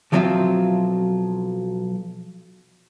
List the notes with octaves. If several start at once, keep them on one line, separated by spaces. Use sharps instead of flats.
B1 F3 F#3 C4 F4 E5